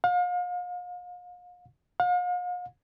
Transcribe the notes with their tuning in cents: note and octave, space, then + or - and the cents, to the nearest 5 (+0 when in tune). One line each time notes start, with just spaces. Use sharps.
F5 +40
F5 +45